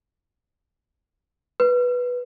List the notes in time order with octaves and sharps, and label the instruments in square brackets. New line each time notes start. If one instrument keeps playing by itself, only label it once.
[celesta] B4